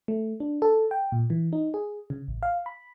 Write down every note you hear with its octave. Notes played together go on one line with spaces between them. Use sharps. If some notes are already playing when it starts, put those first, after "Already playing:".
A3
D4
A4
G5
A#2
E3
D#4
G#4
C#3
A1
F5
B5